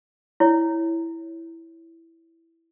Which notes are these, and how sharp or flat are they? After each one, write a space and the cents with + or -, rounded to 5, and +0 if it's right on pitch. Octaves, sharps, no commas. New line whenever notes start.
E4 +0 C#5 +0